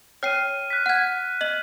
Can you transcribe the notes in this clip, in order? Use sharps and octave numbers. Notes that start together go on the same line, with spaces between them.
C#5 G5 F6 C7 D#7
F#6 B6
F#5 G#6
D#5 F#7